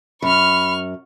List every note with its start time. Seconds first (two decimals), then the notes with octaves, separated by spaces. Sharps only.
0.22 F#2 B5 C#6 F6